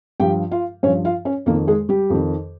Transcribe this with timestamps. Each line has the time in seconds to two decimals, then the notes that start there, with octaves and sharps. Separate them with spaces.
0.20 G2 F3 G4 G5
0.51 F4 F5
0.83 G2 C#4 C#5
0.87 F3
1.05 F4 F5
1.25 C#4 C#5
1.46 F2 D#3 A#3 A#4
1.68 G#3 G#4
1.89 G3 G4
2.10 F2 D#3